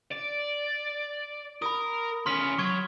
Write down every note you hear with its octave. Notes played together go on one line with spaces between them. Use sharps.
D5
A#4 B5 D#6
E2 C#4 C6 F6 B6
F#3 C#6 G#6